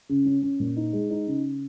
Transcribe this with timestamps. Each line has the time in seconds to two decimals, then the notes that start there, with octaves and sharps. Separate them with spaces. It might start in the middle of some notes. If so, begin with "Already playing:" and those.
0.09 C#3
0.25 C#4
0.42 C#4
0.60 A#2
0.76 D#4
0.93 G#3
1.10 D#4
1.27 C#3